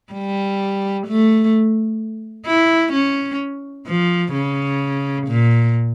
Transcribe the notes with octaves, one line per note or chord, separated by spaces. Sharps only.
G3
A3
E4
C#4
F3
C#3
A#2